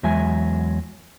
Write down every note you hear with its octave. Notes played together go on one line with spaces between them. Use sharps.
E2 F#3 G#3 E5 G#5